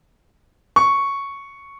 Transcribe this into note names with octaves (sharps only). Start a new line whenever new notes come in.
C#6